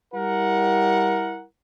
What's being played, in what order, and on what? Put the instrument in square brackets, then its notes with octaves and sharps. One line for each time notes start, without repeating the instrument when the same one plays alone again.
[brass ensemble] G3 E4 A#4 F#5